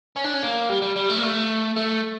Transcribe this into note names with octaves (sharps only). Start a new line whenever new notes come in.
C#4
D4
C#4
A#3
G3
G3
G3
A3
A#3
A3
A3